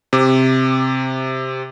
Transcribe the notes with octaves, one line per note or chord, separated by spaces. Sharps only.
C3 D6